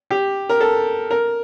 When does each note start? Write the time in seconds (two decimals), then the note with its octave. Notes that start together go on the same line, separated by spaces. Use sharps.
0.11 G4
0.49 A#4
0.60 A4
1.11 A#4